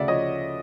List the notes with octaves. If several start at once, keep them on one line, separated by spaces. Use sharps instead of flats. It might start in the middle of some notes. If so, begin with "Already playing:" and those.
Already playing: D2 C#3 D5 E5 F#5
F3 C#5 D#5